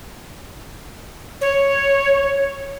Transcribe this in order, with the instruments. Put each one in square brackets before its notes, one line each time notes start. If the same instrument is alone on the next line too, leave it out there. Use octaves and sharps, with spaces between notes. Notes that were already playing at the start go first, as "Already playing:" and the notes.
[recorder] C#5